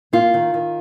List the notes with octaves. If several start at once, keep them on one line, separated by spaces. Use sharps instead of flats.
A#3 F4
D#3
D#3